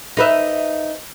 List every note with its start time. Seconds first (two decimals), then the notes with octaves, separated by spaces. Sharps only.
0.17 D#4 B4 E5